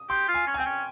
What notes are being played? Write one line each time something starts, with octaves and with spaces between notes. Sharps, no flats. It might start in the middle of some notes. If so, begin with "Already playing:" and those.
Already playing: D#6
G4 C6
F4
G#5
C#4
G#5
C4 G5
C#4